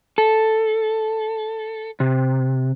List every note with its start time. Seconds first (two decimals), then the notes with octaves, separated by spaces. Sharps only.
0.18 A4
2.00 C3